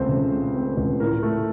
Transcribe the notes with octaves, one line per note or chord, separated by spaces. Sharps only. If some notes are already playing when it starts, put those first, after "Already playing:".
Already playing: C#2 A3 C4 C5
C#3
A3
C4
C#2
A2 A#4
A3